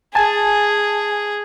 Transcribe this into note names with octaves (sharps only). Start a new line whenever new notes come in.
G#4 G#5 A5